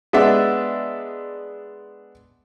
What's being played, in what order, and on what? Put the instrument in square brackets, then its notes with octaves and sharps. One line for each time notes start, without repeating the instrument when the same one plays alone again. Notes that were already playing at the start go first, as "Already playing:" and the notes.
[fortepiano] G#3 B3 D4 D5 E5